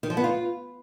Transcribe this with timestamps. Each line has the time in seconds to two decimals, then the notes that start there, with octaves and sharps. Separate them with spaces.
0.03 D#3
0.10 F3
0.17 B3
0.24 F4